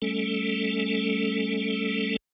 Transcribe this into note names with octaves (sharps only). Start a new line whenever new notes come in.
G3 A3 C#4 A4